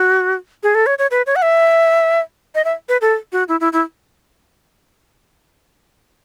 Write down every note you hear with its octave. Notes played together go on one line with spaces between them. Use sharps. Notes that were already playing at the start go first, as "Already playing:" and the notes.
Already playing: F#4
G#4
A4
C#5
C#5
B4
C#5
F#5
E5
D#5
E5
B4
A4
F#4
E4
E4
E4